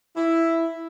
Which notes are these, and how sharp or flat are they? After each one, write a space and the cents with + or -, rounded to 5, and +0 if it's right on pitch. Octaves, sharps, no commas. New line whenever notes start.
E4 +0